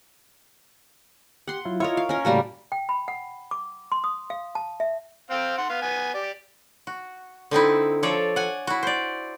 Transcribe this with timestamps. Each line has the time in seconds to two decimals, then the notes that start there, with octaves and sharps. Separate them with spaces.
1.48 G4 F#5 C6
1.65 F#3 E4 F4
1.80 E4 F4 A#4 C#5 D#5
1.97 F5
2.09 C#4 A#4
2.25 A2 C#3 G3 A#3 F#4 A5
2.72 G5
2.89 B5
3.08 F#5
3.51 D6
3.92 C6
4.04 D#6
4.30 F5
4.55 A5
4.80 E5
5.30 C4 F5 G5
5.58 F#5 C6
5.69 B3 F5
5.82 B3 G#5
6.14 G4 D5
6.87 F#4
7.51 D3 C4 D#4 E4
8.03 F3 A4 C#5 D5
8.36 F#5 G#5
8.67 E4 F#4
8.83 C5 D5